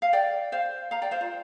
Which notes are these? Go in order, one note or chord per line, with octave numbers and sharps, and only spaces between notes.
F5
D5 G5
C5 F5
F5 A#5
D5 G5
C5 F5
F4